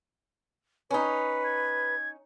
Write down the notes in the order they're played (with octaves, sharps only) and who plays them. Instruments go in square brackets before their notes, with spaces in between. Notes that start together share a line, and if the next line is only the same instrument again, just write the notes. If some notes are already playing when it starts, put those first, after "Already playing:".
[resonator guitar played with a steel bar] C#4 D#4 [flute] B4
[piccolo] G#6